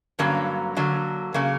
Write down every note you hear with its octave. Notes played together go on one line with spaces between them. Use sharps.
G2 D3 F#3 A#3 C#4
D3 F#3 A#3
C#3 F#3 A#3